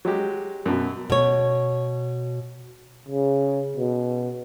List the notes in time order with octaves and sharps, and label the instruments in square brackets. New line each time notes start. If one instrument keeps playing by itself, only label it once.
[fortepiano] F#3 G#3 G4
F#2 B2
[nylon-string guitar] B2 C#5
[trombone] C#3
B2